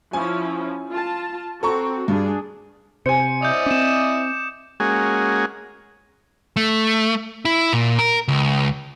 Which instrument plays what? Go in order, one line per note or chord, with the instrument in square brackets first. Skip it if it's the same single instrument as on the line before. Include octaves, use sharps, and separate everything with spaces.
[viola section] F3 C#4 E4 [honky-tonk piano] G#5
[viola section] F4 A5
[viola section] C4 F#4 [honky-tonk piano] A4 A#5 C#6
[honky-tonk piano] G2 [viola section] D4 G#4
[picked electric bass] C3 [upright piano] C5 G#5 [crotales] C#7
[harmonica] E4 D5 D#5 [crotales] D#6 G6
[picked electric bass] C4 C#4 [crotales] D6 E7
[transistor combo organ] G#3 A#3 C#4 F#4 G#4
[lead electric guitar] A3
E4
A#2
A#4
C#2